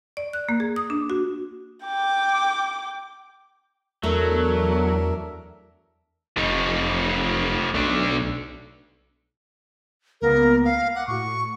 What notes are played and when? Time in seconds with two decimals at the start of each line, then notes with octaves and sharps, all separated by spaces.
0.17 D5
0.33 F#6
0.49 A#3
0.60 G#4
0.76 D#6
0.90 D4
1.10 F#4
1.84 G5 D6
4.04 E2 F#3 A3 D4 A#4 E5
6.37 F1 A3 D#4
7.74 B1 A3 D4
10.21 C#2 A#3 B3 A#4
10.65 F5
10.95 F#5 D6
11.07 A2 F#4 C#6